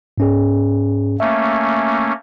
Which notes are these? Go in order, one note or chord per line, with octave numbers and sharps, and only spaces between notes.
G#2 C#4 G#4
A3 A#3 C#4 E5